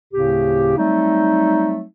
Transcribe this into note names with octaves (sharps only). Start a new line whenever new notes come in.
D2 A2 C#3 C4 G4
F#3 G3 A3 C4 D#4